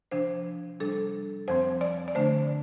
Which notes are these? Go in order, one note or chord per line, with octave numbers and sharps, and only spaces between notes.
C3 F3 D4 C5
C3 G3 D4 A4
F2 F3 C4 C5
D5
D5
D3 A3 D4 C5